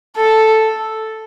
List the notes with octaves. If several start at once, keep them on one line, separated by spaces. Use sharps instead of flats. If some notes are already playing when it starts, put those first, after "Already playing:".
A4